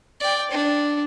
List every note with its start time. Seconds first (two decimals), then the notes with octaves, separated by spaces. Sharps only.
0.20 D5 G5
0.52 D4